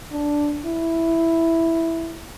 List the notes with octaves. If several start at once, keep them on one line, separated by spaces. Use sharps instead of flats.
D4
E4